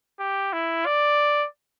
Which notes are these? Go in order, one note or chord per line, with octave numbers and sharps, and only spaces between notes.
G4
E4
D5